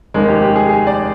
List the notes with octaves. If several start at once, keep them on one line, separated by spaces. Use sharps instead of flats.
F1 D#2 D#3 G#3
G4
G4
G#4
G#4
D5